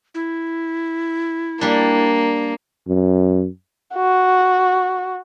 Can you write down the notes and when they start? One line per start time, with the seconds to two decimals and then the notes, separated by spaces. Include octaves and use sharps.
0.15 E4
1.61 G3 A#3 D4
2.88 F#2
3.95 F#4